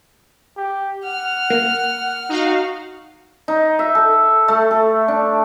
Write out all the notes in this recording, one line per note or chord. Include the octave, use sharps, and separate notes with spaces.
G4
F#5 F6
A#3
D#4 F#4 F5
D#4
E5
A4
A3
A4
D4